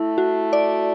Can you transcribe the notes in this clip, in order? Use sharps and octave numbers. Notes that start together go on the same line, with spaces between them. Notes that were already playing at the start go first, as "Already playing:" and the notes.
Already playing: A3 E4
F#4
D5